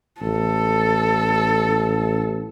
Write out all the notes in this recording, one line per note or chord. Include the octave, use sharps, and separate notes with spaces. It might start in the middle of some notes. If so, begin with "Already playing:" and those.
A1 A4